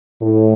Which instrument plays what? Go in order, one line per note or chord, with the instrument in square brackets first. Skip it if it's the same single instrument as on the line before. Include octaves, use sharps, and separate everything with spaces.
[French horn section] A2